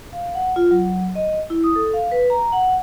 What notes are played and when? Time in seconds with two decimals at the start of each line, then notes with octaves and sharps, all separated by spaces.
0.13 F5
0.34 F#5
0.56 F4
0.71 F#3
1.15 D#5
1.50 E4
1.64 D#6
1.76 A4
1.94 F5
2.12 B4
2.30 A#5
2.52 F#5